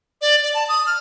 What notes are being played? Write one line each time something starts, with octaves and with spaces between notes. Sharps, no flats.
D5
D5
A5
D#6
F6